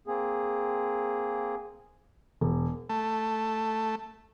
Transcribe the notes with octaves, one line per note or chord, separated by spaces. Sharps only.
A#3 C4 G#4
E1
A3